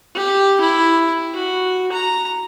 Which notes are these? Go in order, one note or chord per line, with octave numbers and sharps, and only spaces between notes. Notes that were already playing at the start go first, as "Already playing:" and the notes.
G4
E4
F#4
A#5